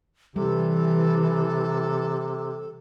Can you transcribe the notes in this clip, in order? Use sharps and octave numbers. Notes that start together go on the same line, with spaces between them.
C3 E3 G3 A4